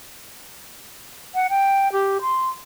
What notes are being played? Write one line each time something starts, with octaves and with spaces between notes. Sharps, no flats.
F#5
G5
G4
C6